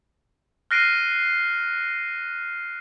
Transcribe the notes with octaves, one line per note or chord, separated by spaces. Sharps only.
F6 F#6 A#6 C7 D7 D#7